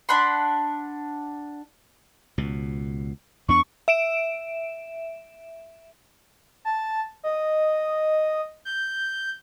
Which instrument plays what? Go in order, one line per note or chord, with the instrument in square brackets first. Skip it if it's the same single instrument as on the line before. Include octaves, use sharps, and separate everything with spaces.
[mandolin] D4 F#5 B5 C6
[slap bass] C#2 B2
[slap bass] E2 B3 D4 [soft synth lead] C#6
[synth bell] E5 D7 E7
[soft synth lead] A5
D#5
G6